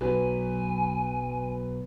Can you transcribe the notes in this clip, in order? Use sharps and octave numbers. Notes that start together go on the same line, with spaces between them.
B1 F#3 B4 G#5